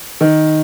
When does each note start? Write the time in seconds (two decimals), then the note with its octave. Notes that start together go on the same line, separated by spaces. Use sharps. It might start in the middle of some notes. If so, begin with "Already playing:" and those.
0.21 D#3